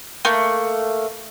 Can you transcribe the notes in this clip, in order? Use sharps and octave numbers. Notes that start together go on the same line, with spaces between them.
A3 A#3